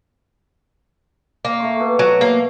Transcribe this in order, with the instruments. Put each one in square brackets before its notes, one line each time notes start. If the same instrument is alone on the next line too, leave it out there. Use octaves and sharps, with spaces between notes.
[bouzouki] A#3
[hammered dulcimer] A3 C#6
B2
[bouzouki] F#3
A#3